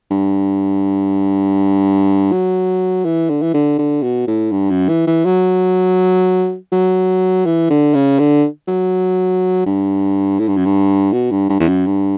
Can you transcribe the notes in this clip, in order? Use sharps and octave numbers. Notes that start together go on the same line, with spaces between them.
G2
F#3
E3
D3
E3
D3
D3
B2
A2
G2
F#2
E3
E3
F#3
F#3
E3
D3
C#3
D3
F#3
G2
A2
G2
F#2
G2
B2
G2
G2
E2
F#2
G2